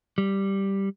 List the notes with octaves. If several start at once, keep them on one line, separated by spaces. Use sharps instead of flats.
G3